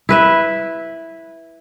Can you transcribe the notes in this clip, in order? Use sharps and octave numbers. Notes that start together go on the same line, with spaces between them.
E4 B4 E5